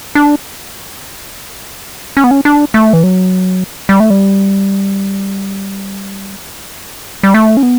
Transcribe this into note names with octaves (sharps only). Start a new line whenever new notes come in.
D4
C#4
B3
C#4
D4
A3
E3
F#3
G3
A3
G3
G3
A3
C#4
B3